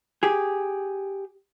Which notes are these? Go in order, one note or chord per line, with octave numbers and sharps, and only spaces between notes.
G4 G#4